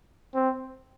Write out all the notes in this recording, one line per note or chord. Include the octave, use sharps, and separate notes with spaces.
C4